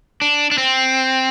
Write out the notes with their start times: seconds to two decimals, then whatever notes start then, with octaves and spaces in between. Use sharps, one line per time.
0.22 D4
0.51 D4
0.58 C4